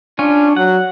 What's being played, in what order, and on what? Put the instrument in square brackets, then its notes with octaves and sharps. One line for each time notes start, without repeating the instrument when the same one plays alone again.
[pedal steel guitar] C#4 F4 [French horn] D4
[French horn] F#3 [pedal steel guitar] F#5